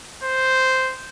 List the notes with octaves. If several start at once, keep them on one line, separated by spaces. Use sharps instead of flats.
C5